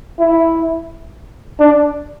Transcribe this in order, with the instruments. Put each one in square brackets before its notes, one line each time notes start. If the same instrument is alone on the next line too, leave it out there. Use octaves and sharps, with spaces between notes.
[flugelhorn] E4
D4